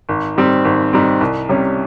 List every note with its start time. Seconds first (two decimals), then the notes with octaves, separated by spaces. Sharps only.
0.09 G#1
0.36 G#2 G3 C4
0.65 G#1
0.93 G#2 G3 C4
1.21 C2
1.49 C3 G3 C#4